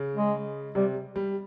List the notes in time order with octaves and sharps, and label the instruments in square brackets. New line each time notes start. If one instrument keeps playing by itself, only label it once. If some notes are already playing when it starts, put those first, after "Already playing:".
Already playing: [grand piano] C#3
[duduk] G#3
[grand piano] C3 [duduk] G3
[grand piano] G3